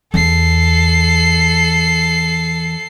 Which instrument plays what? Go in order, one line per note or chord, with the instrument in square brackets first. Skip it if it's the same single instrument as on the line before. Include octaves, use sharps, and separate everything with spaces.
[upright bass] E2 [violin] A4 C7